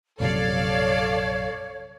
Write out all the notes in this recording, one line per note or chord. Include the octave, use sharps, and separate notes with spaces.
A#1 F#2 C3 A4 C#5 D5 F5